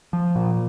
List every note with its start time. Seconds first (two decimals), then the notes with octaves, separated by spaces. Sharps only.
0.13 F3
0.36 A#2